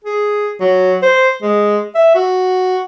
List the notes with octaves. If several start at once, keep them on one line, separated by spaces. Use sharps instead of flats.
G#4
F#3
C5
G#3
E5
F#4